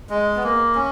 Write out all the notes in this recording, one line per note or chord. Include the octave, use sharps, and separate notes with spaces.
G#3
B3
A#3
C#4